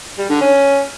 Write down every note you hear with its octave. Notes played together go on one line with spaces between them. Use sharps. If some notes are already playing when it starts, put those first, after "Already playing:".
G3
D3
C#4